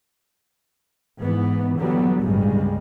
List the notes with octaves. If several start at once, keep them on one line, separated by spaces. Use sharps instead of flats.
G#2 E3 B3
D3 E3 F#3 G3 B3
G1 C#2 A2 C#3 G3 G#3